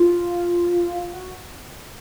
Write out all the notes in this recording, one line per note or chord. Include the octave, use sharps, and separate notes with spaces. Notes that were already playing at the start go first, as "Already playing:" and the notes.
Already playing: F4
F#4